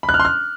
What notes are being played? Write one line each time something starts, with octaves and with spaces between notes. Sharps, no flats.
B5
F#6
F6
C6
F6